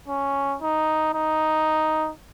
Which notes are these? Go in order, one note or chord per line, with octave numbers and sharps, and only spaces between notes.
C#4
D#4
D#4